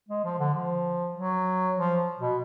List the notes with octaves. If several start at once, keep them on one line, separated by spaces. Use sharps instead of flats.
G#3
F3
D3
F3
F#3
F3
B2